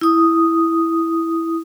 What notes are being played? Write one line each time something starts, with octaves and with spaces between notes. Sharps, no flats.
E4 D#6